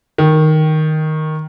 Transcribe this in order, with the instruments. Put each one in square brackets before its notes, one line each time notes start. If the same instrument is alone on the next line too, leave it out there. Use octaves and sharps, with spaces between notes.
[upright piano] D#3